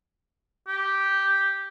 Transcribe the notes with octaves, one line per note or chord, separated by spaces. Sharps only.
G4